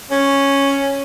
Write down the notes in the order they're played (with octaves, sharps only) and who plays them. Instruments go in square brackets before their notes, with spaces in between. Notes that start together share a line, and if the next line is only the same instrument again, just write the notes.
[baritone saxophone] C#4